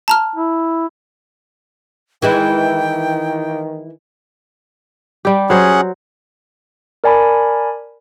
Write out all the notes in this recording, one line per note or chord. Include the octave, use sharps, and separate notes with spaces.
A5 A#5 F6
E4
D#3 E3 G#3 E4 G5
G3 G4
F#3 C#4 G#4 C5 F#5
A#4 D5 G#5 A5 B5